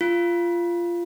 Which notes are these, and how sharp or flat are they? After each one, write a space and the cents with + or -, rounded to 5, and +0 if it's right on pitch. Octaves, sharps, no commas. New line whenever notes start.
F4 -15